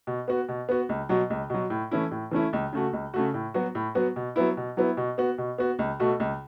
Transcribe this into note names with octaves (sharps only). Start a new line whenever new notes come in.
B2
B3 F#4
B2
B3 F#4
C#2
B2 F#3
C#2
B2 F#3
A2
E3 A3 C#4 E4
A2
E3 A3 C#4 E4
C#2
C#3 A3 F#4
C#2
C#3 A3 F#4
A2
F#3 B3 F#4
A2
F#3 B3 F#4
B2
F#3 B3 E4
B2
F#3 B3 E4
B2
B3 F#4
B2
B3 F#4
C#2
B2 A3 F#4
C#2